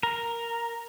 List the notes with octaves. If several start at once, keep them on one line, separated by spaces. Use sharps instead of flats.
A#4